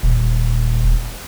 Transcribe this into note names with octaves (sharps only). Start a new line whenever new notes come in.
D#1